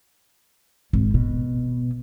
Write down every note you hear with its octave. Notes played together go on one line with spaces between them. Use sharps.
G#1
B2